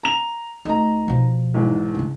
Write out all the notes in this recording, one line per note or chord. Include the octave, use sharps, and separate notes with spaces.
A#5 F7
D2 A3 D#4 D#5 A#5
B2 F3
B1 E2 G#2
C#3 D4